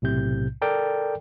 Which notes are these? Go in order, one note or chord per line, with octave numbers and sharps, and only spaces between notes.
B1 A2 C3 G6
A4 A#4 D5 G5